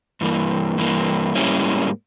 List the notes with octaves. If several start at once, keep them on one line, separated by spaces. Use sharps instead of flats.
G2 E3 A#3
G2 E3 A#3
G#2 G3 A#3 C#4 E4